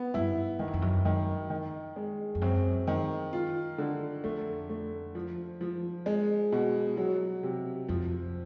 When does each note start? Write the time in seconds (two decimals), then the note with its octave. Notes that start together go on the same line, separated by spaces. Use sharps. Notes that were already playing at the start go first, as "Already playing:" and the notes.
Already playing: B3
0.14 G2 E4
0.59 G2 D#3
0.67 F#2
0.74 F2
0.82 F#2
1.05 D#3
1.50 D#3
1.96 G#3
2.35 F2
2.42 F#2 C4
2.87 D#3
3.33 F4
3.78 D3
4.24 F2 A3
4.69 A3
5.15 F3
5.61 F3
6.06 G#3
6.52 B2
6.97 F#3
7.43 C3
7.88 F2 F3